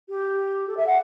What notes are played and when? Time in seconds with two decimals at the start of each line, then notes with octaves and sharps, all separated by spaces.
0.08 G4
0.67 A4
0.76 E5
0.86 F#5